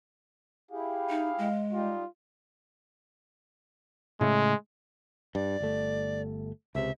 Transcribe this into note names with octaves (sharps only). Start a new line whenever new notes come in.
E4 G4 G#4 F5
D#4
G#3
G3 D#4 F4 G4
A2 C#3 G#3 A3
G2 D5
G1 A3
C#2 C3 E5